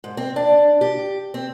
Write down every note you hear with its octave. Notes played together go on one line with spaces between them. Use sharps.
G#2
C4
D4
G4
C4